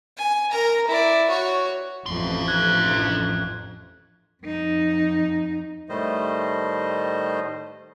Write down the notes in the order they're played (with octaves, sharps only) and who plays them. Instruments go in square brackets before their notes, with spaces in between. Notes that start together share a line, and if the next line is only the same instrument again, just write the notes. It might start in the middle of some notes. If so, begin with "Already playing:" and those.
[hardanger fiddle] G#5
A#4 A#5
E4 D5
F#4 C#5
[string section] A1 F2 [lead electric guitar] D4 C6
[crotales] F#6 G#6
[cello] F2 D#4
[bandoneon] A2 D#3 G3 A3 C5 D#5